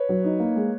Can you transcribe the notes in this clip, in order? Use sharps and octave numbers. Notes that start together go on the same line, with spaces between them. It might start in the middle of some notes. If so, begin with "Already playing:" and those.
Already playing: B4 C#5
F#3
D#4
A#3
G#3